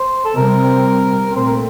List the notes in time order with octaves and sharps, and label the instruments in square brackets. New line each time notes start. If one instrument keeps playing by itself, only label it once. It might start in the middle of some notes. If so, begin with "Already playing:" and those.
Already playing: [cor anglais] C5
A4
[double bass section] C3 G3 C4 [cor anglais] A#4
[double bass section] A#2 A3 C4
[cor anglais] C5
A#4